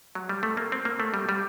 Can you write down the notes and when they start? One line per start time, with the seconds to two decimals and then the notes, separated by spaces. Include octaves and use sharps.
0.15 F#3
0.29 G3
0.43 A3
0.57 A#3
0.72 C4
0.85 A#3
1.00 A3
1.14 G3
1.29 G3